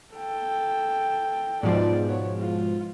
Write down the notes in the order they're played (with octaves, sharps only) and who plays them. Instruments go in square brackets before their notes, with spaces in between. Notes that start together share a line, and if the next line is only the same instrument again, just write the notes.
[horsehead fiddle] A4 G5
[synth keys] G#2 B2 F3 [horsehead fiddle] D5
[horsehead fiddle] B3 C#5
F4